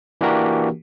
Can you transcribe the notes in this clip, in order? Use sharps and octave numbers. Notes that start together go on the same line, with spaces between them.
E3 A#3 D4 F#4 G4 A#4